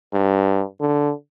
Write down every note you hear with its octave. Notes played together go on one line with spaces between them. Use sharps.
G2
D3